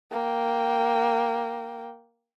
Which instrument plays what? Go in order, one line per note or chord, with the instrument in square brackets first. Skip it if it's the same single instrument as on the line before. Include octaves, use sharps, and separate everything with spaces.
[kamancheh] A#3 G5